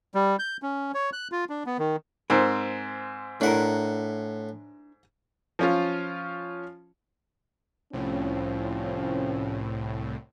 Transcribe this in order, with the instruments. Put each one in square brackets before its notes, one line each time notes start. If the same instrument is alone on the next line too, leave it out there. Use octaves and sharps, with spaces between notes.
[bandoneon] G3
G6
C#4
C#5
F#6
F4
D4
B3
D#3
[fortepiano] G#2 C4 [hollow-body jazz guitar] A#4
[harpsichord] A2 F#5 [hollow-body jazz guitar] D4 E4 A#4
[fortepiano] F3 C#4 F4
[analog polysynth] C2 A2 [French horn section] F3 C4 C#4